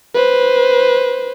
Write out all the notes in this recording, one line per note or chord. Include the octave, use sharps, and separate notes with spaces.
B4 C5